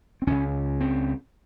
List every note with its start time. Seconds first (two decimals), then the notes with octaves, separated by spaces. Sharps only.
0.22 C4
0.27 C#2 C#3 C#4
0.81 C4